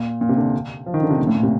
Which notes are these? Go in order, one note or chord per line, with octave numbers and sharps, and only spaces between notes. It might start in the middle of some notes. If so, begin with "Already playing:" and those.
Already playing: A#2
A#2
C3
D3
F3
D#3
D3
C3
A#2
A2
A#2
C3